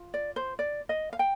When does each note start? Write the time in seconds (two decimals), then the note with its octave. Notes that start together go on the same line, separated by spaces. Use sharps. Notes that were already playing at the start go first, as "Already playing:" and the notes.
Already playing: F4
0.14 D5
0.36 C5
0.59 D5
0.89 D#5
1.13 F5
1.19 G5